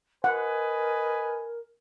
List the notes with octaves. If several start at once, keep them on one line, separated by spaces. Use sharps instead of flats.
A#4 B4 D#5 F#5 G#5